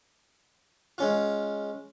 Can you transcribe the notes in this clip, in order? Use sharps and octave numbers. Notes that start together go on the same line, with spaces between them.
G#3 C#4 F4